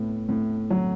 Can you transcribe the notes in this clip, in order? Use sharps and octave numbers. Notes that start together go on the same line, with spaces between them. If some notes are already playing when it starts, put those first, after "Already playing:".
Already playing: A2 B3
A2
F#3